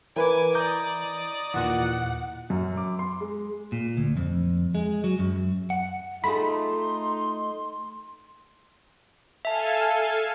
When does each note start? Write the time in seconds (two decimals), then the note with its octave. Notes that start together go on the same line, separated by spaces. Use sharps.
0.16 E3 A#4 B4 G#5 D6
0.55 D5 D#5 A#5 D6 G6
1.54 D#2 A#2 E3 F#5
2.50 F#2
2.77 D6
2.99 C6
3.21 G#3
3.72 A#2
3.97 D2
4.17 F2
4.75 G#3
5.04 F#3
5.19 F#2
5.70 F#5
6.24 A3 D#4 F4 G#4 B5 C6
9.45 A4 E5 F5 G#5 A5